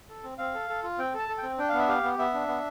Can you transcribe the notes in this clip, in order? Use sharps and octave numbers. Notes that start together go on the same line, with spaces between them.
A4
C4
C4 F5
A4
A4
F4
C4 G5
A4 A5
A4
G5
C4
D4 G5
B3 F5
E5
G4 F5
B3
B3 E5
D4
B3